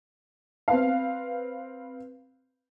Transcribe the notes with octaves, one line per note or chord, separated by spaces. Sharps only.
C4 B4 F5